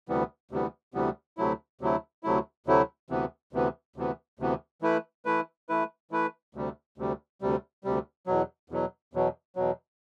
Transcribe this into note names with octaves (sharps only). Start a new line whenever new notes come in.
D2 C3 E3 G3 B3
D2 C3 E3 G3 B3
D2 C3 E3 G3 B3
D2 C3 F#3 A3 E4
D2 C3 F#3 A3 E4
D2 C3 F#3 A3 E4
D2 C3 F#3 A3 E4
D2 C3 E3 B3
D2 C3 E3 B3
D2 C3 E3 B3
D2 C3 E3 B3
E3 A3 E4 B4
E3 A3 E4 B4
E3 A3 E4 B4
E3 A3 E4 B4
D2 C3 G3
D2 C3 G3
D2 C3 G3
D2 C3 G3
E2 B2 F#3
E2 B2 F#3
E2 B2 F#3
E2 B2 F#3